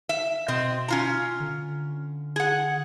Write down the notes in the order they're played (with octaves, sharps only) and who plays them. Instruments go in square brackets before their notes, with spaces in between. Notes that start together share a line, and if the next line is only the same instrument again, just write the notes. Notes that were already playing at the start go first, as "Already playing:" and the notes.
[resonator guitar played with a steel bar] E5
[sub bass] B2 [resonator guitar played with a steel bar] C4 D#5
[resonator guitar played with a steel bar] C#4 F4 A#5
[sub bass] D3
[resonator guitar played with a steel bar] G#4 F#5